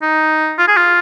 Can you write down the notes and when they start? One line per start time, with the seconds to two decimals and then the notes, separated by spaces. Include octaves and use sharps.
0.02 D#4
0.58 F4
0.68 G#4
0.77 F4